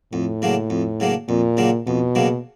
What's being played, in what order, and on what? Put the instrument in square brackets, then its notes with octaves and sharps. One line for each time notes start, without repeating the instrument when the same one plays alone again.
[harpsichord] F2 [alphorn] A2
[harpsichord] C#3 F#3 A#3 D4
F2
C#3 F#3 A#3 D4
[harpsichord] F2 [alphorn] A#2
[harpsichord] C#3 F#3 A#3 D4
[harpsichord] F2 [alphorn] B2
[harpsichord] C#3 F#3 A#3 D4